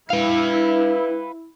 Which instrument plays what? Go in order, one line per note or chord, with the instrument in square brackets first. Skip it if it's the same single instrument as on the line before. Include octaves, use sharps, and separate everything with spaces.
[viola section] E4 [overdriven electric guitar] B4 F5